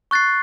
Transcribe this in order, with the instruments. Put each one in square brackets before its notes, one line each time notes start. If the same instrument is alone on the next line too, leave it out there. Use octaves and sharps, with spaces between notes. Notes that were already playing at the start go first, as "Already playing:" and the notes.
[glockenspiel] C#6 F#6 A6 C7